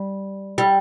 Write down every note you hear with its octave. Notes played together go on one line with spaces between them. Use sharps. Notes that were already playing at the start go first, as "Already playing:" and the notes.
Already playing: G3
G3